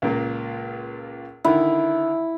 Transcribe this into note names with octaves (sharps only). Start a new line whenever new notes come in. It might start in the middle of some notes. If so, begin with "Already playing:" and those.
C#2 A#2 A#3
D3 D#3 E4